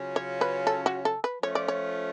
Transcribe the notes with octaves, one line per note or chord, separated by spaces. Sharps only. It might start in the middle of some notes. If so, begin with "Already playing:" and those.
Already playing: C#3 F#3 C#4 F4
C#5
B4
A4
F#4
A4
B4
F3 A3 C#4 F4 C#5
D5
C#5